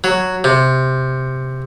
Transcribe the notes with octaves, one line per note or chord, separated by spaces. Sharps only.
F#3
C3